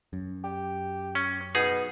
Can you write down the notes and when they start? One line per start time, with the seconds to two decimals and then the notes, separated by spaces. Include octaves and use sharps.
0.13 F#2
0.44 G4
1.15 C#4
1.55 B2 D#4 G#4